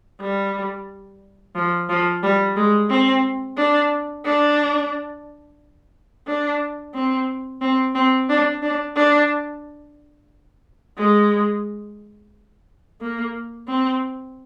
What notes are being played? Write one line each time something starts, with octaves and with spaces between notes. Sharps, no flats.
G3
F3
F3
G3
G#3
C4
D4
D4
D4
C4
C4
C4
D4
D4
D4
G#3
A#3
C4